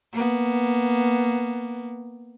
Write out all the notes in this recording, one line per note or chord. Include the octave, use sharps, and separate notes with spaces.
A#3 B3